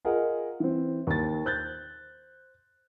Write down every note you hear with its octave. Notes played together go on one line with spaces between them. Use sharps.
F4 G#4 A#4 D#5 F#5
E3 C4
D#2 A6
C5 F#6 G6 A6